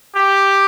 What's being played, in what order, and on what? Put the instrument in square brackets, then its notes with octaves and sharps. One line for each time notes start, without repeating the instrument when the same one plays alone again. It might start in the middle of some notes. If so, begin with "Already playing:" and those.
[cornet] G4